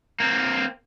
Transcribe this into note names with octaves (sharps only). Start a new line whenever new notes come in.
A#3 C4